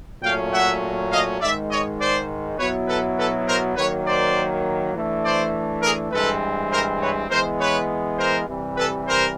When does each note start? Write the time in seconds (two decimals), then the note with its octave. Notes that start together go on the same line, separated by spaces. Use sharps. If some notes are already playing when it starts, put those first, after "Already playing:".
0.23 A#2 F#3 A3 C#4 F5 G5
0.52 E5 F#5
1.10 D#5 F5
1.40 G#2 D#3 G#3 D5 E5
1.69 C#5 D#5
1.99 C5 D5
2.58 B2 F#3 B3 E4 B4 C#5
2.88 A4 B4
3.17 A4 B4
3.47 A#4 C5
3.76 D#3 F#3 A#3 B4 C#5
4.05 C5 D5
4.94 E3 A3 D4
5.23 C5 D5
5.82 G#4 A#4
6.11 G2 E3 G#3 C4 A4 B4
6.70 A#4 C5
7.00 B4 C#5
7.29 E3 G#3 B3 A#4 C5
7.59 B4 C#5
8.18 A#4 C5
8.47 C3 E3 G3
8.77 A4 B4
9.07 A#4 C5